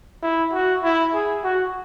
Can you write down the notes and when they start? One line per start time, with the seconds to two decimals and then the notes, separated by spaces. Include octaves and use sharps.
0.23 E4
0.53 F#4
0.84 E4
1.14 G#4
1.44 F#4